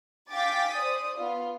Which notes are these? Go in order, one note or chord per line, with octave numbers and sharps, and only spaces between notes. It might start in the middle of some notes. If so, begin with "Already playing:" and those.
F5 G5 G#5 D6 A6 B6
C5 D5 D#6
B3 F4